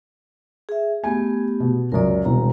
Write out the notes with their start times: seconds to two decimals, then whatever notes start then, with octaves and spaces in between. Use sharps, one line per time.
0.69 G#4 E5
1.04 A3 B3 G4 G#5
1.60 B2
1.92 C#2 F#2 A#4 D5
2.25 E1 C2 A#5